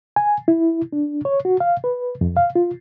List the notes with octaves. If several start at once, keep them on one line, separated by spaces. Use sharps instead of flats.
G#5
E4
D4
C#5
F#4
F5
B4
F2
F5
F4